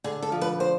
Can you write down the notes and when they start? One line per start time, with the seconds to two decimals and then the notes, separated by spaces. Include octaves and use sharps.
0.04 D3 G#4
0.22 A4
0.32 F3
0.41 B4
0.60 C5